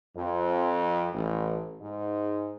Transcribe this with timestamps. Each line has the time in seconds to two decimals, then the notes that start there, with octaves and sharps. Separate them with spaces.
0.16 F2
1.13 A1
1.81 G#2